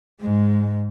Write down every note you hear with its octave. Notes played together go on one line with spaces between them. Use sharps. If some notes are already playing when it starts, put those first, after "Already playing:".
G#2 G#3